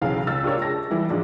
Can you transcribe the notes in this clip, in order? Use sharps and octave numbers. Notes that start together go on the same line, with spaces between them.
F#1 B1 C#3 E3 F5
C#2 E6 A6
D4 F4 G4 A#4 C#5 D5
G#3 A5 A#6
E3 G3 E4
G#2 F3 G#3 D4